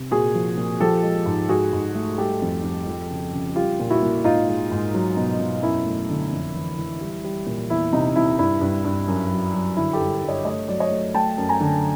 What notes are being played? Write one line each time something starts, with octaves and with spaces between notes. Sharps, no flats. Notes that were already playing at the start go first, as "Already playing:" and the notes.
Already playing: C3
A#2 F#4 G#4
F3
A#2
F3 G4 A4
G#3
G#2
G#2 F#4 G#4
G#2
A3
G3 G4 A4
F2
F2
F3
C#3
C#3
G3 F4 G4
A#2
E4 F#4
A#2
G#2 D#4 F4
G#3
G#2
F#3
B2
B2
F#2 E4
A3
D3
F2
E3
E3
G3
G3
A#2
E2 E4
C3 D#4
C3 E4
G2 E4
G2
G2
F#2
F#3
F#3
D3 E4
G4 A4
G2
G2
C#5 D#5
A3 C#5 D#5
F#3 D5
C#5 D#5
A3
A3 G5 A5
F#2
G#5 A#5
D3